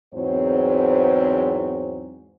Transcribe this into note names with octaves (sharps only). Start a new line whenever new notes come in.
E2 G#2 F#3 C4 C5 C#5